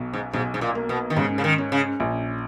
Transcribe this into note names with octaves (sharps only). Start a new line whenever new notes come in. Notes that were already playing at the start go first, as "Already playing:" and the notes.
Already playing: B1 B2
G#2
B1 G#2
G#2
A#2
A#3
B2
D#3
G#2 C#3
C#3
D#3
C#4
C#3
A#1